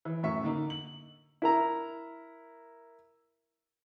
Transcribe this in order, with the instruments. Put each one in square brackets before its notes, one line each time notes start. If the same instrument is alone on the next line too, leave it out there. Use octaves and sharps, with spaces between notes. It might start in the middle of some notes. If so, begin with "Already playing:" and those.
[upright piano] E3
F#2 A2 E5 C#6
D3 A#3 D#4
F#7
[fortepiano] E4 A#4 A#5